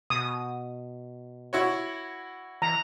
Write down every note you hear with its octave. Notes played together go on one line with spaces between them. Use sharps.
B2 D#6
E4 F#4 C#5
E3 A#5